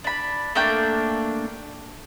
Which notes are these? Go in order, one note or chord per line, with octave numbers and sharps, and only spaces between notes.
D4 B5
A3 A#3 D4 G5